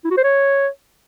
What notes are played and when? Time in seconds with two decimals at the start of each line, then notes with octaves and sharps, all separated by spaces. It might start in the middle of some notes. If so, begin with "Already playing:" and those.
0.05 E4
0.11 F#4
0.17 C5
0.24 C#5